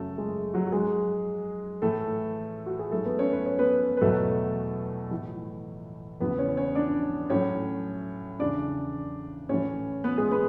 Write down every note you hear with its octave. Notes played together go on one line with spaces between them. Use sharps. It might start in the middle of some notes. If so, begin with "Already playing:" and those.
Already playing: F#2 C#3 F#3 A3 A4
G#3 G#4
F#3 F#4
F#4
G#2 F#3 G#3 G#4
A2 E3 A3 A4
F#4
G#4
G#2 F#3 A3 A4
B3 B4
C#4 C#5
B4
C#5
B3 B4
B4
E2 B2 F#3 A3 A4
A2 E3
E2 C#3 E3 B3 B4
C#4 C#5
C#4 C#5
D4 D5
A2 F#3 C#4 C#5
E2 C#3 E3 D4 D5
A2 E3 C#4 C#5
B3 B4
G#3 G#4
B3 B4